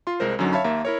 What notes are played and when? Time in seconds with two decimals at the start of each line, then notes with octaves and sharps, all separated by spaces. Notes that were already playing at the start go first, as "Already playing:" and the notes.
0.07 F4 C6
0.20 C2 G#3 A#4 C5
0.39 F#2 D3 F#3 C#4 D#4
0.53 C#5 E5 F5 A5 B5
0.64 D#2 A#3 E5 A#5
0.85 E4 A#4 C#5